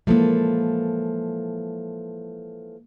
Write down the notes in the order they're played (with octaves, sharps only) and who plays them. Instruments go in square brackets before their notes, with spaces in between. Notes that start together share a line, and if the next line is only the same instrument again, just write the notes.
[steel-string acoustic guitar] E3 F3 A4 [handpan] G#3 A#3